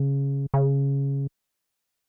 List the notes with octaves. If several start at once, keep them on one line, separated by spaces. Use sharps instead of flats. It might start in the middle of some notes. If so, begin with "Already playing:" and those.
Already playing: C#3
C#3